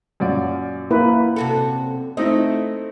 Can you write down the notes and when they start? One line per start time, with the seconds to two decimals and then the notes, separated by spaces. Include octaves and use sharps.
0.20 F#2 A#2 D5
0.91 A#3 E4 B4
1.36 C3 F#4 A4
2.17 A3 C4 D#4 E4 D#5